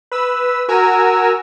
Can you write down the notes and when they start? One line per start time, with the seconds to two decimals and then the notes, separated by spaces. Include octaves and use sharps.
0.12 B4 E6
0.68 F#4 A#4 G#5 A#5 E6